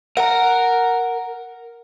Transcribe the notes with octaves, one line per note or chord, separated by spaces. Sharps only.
A#4 F#5 A#5